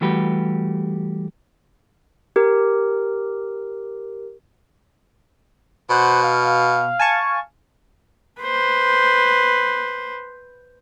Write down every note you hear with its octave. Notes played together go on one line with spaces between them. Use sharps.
E3 G3 A3 F#4 G4 B4
G4 A#4
B2 B4 C5 F#5
F5
G#5 A5 C#6
B4 C5